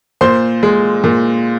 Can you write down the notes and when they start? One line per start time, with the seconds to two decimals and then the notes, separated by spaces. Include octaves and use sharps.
0.21 A#2 C5 C6
0.63 G#3
1.04 A#2